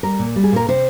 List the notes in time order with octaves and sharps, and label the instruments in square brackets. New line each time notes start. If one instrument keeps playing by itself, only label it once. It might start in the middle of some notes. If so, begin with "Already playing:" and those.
[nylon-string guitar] G3 A#4
A#2
G3
G#4
A#2 A#4
C3 C5